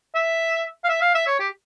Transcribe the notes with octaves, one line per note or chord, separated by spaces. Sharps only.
E5
F5
E5
F5
E5
C#5
G4